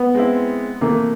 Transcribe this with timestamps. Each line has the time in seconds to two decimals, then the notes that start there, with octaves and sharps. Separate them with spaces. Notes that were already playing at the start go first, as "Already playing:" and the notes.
Already playing: B3
0.15 G#3 C4 E4
0.81 C3 E3 A3 A#3